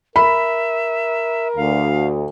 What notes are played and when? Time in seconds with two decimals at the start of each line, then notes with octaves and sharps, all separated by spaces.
0.16 A#4 E5 B5
1.56 D2 F5